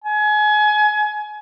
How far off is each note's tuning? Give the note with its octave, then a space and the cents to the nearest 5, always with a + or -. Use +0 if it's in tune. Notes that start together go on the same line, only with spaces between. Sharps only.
G#5 +30